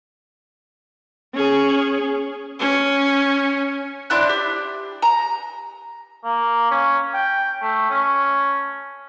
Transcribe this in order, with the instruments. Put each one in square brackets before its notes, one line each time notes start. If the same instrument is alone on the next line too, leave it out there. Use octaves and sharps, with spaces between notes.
[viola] C#4 G#4
C#4
[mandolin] D4 E4 C5 F#6
G4
A#5
[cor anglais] A#3
C#4
G5
A3
C#4